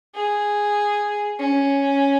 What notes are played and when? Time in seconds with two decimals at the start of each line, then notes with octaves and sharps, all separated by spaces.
0.14 G#4
1.39 C#4